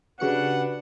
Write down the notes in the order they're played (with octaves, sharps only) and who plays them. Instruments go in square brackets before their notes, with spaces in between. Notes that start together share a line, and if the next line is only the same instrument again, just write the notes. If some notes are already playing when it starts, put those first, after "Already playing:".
[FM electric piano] C#3 F#4 C#7 [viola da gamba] D4 [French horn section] G4 B4 [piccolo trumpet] F#5